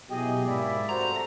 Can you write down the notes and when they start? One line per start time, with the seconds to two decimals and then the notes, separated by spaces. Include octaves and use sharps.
0.10 B2 F#3 E4 G4 G#4 D#5
0.46 G#2 A#3 E4 D5
0.89 C3 A3 D4 F#4 C5 A#5